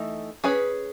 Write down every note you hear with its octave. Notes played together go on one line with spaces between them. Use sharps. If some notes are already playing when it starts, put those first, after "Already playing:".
Already playing: E3 A3 D#4
C#4 G#4 B4